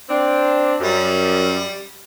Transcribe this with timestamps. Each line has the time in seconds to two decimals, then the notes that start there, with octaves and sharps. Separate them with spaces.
0.10 C4 D4
0.80 F#2 G3